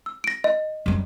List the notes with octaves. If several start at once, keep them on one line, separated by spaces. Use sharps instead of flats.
E6
A#6 D7
D#5
F#2 G3